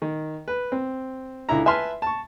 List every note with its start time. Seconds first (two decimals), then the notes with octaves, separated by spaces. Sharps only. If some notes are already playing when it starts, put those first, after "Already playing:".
0.02 D#3
0.48 B4
0.72 C4
1.49 C#2 D3 E4 A#5
1.66 B4 E5 G#5 A5 C6 F6
2.02 A5 C#6